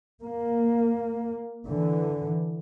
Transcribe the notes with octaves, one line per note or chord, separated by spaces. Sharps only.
A#3
D3 E3